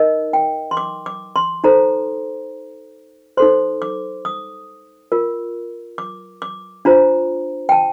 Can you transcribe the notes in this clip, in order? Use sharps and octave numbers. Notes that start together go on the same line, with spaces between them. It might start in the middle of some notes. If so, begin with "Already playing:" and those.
Already playing: D#4 A#4 D#5
G5
C6
D6
D6
C6
D#4 A4 C5 A#5
D#4 A4 C5 C6
D6
D#6
F4 A#4
D6
D6
D4 F4 C5 A#5
G5
A5